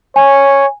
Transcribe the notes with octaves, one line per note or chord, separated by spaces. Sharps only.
C#5 G#5